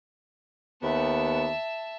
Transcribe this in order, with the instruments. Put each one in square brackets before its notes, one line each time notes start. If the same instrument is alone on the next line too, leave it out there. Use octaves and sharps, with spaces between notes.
[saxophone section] D#2 B3 [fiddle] E5 A5